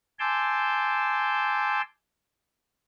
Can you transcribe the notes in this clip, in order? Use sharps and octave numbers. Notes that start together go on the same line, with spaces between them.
G#5 A5 C6 D6 E6 G6